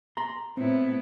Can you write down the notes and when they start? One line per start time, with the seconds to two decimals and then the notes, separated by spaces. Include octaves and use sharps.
0.17 A#5 C6
0.57 A2 B3 C4 E4